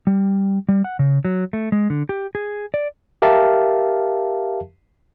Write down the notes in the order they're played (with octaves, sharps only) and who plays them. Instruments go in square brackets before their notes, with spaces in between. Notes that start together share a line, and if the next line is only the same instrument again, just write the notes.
[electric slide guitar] G3
G3
F#5
C#3
F#3
A3
G#3
D3
G4
G#4
D5
[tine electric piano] G4 A#4 E5 F5 A5